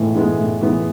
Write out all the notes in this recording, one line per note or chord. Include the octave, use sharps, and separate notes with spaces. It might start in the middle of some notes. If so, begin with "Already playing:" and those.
Already playing: A2 E3 G#3 B3
E3 G#3 B3
A2
E3 G#3 B3